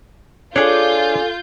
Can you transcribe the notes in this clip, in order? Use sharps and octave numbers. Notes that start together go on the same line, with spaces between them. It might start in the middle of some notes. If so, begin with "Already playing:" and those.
D4 F4 G#4 A4 C#5 G6